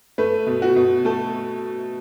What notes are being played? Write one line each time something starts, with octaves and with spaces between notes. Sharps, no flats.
A3 B4
B2
F#4
B2
A3 A4